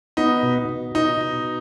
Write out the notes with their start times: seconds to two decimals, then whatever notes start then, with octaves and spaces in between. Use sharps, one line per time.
0.17 B3 D#4
0.43 B2
0.69 B2
0.95 B2 D#4
1.21 B2